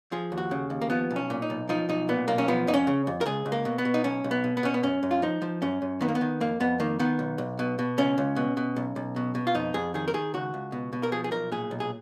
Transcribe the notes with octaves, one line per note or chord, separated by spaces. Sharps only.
F3 G#4
D#2
F#4
C#3
D#2
A#3
F3 B3
B1
C#4
A#2
D#4
B1
F3 D#4
B1 D#4
A#2 B3
B1 A#3
C#4
F3 B3
F2 D#4
C#4
C#3
F2
A#4
C#2 G#4
C#2
A#3
B2
B3
B2
D#4
B1 C#4
B1
B3
B2
B3
B2 C#4
B3
F#2 C#4
F#2
F4
F3 D#4
F3
F#2 C#4
F#2
D#3 B3
A#3
B3
D#3
F2 A#3
F2 B3
D#3 A#3
D#3 B3
B1
B1
B2
B2
C#2 C#4
C#2
B2
B2
B1
B1
B2
B2
F4
F2 D#4
F2 G#4
D#3 G#4
A#4
D#3 G#4
C#2 F#4
C#2
B2
B2
A#4
F3 G#4
G#4
B1 A#4
A#2 G#4
B1
G#4